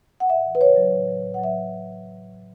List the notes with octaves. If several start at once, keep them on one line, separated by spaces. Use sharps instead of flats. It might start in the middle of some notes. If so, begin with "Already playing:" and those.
F#5
A2 E5
E3
B4
C#3 C#5
F#3
A2
F#3
A2
F#5
F#3 E5